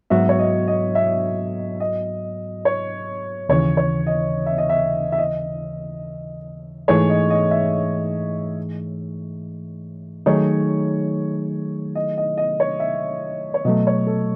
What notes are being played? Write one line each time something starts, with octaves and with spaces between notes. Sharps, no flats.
G#2 F#3 B3 F#4 E5
C#5
D#5
D#5
E5
D#5
C#5
D#2 C#3 E3 C#5
C#5
D#5
E5
D#5
E5
E5
D#5
G#2 E3 A3 D#4 G#4 C#5
D#5
D#5
E5
D#3 F#3 A3 D#4 G#4 C#5
D#5
D#5
D#5
C#5
E5
C#5
B2 F#3 A3 D#5
C#5
A4